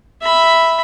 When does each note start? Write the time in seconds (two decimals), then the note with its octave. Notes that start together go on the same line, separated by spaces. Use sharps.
0.22 E5 B5